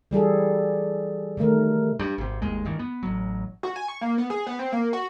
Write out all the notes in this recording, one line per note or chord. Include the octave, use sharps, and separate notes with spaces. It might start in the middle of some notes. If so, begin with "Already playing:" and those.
E3 G3 G#4 A4
C3 D#3 A3 A#4
G2
G#1 C3
G1 D#2 G#3
G2 D#3 E3
B3
A1 F#3
F#4
G#5
C#6
A#3
B3
G#4
B3
C4
A#3
F#4